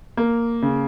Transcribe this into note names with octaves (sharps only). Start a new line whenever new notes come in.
A#3
C#3